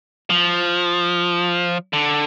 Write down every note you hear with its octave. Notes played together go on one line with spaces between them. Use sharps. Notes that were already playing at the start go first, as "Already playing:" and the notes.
F3
D3